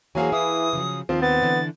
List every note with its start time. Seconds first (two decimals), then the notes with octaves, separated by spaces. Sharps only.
0.15 E3 F#3 A#3 G#4 C5 F5 G#5
0.32 E3 E4 D#6
0.73 C#3 F3 F#3
1.09 D#2 D#3 F3 C4 F4
1.22 B3 A6
1.42 D3 E3 D4